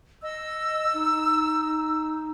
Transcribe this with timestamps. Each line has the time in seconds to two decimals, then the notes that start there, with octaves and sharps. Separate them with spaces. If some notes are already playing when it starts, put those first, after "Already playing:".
0.23 D#5 E6
0.94 D#4